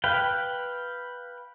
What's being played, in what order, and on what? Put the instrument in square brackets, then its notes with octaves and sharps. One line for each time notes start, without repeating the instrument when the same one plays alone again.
[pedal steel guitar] B4 F5 G5